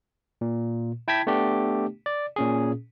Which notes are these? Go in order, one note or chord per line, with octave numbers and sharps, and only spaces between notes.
A#2
E4 G5 A5 G#6 B6
A3 B3 D4 G4
D5
A#2 C#4 G#4